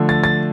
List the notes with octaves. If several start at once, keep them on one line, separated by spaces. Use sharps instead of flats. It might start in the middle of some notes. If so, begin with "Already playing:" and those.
Already playing: D3 F3 A3
A6
A6